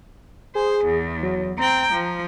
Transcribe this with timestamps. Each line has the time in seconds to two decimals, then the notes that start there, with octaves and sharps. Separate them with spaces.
0.55 G#4 C5
0.85 E2
1.23 F#3
1.58 C4 G5 A#5
1.93 F3